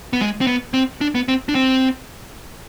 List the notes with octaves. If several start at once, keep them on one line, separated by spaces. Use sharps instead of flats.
B3
G#3
C4
B3
C4
D4
B3
C4
D4
C4